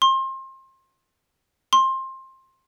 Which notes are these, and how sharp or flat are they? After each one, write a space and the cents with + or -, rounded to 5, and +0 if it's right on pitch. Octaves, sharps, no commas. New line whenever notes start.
C6 +30
C6 +20